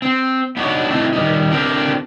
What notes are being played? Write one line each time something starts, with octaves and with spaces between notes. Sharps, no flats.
C4
B3 D4 D#4 F#4 B4 C#5
A3 C4 D#4 E4 A4
D#3 F3 G3 D#4
D3 C4 D4 G4 A#4 C5